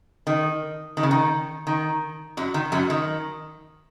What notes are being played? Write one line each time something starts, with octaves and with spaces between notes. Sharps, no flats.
D#3
D#3
C#3
D#3
D#3
F#2 F#3
D#3
F#2 F#3
D#3